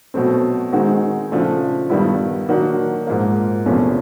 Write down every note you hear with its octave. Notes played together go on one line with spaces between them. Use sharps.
B2 F#3 A3 C4
D#3 G#3 C4 D#4 F#4
C#3 F3 A3 D4
G2 D#3 G3 B3 E4
D#3 F#3 A#3 D4 F#4
G#2 F3 A#3
E2 C3 F3 A3 C#4